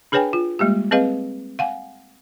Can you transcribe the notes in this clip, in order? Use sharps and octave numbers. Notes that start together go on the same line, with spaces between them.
D4 G#4 B4 C#5 G5 G#5
F4
G3 G#3 A#3 G4
C4 G#4 B4 D#5 F5
F5 F#5 G#5